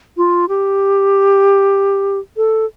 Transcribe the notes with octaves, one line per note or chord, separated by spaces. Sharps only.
F4
G4
A4